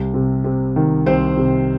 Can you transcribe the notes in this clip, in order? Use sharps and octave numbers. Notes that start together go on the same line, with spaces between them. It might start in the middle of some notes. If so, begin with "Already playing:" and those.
Already playing: C2
C3
C3
D#3
C2 C4 C5
C3